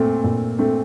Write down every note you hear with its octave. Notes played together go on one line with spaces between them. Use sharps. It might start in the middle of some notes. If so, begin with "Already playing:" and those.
Already playing: A#2 A3 C4
A#2
A3 C4